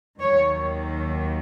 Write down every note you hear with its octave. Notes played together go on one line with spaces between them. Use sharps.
D#2 D#3 F#3 C#5